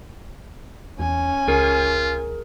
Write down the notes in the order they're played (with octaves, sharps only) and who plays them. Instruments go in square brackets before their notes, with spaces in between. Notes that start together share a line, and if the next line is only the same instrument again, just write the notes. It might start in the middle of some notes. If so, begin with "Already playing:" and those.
[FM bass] E2 [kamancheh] C#4 G#5
[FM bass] C#2 [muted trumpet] F4 [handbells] G#4 A#4